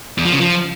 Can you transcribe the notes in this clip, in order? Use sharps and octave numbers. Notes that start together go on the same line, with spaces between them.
E2
F3
C#3
F3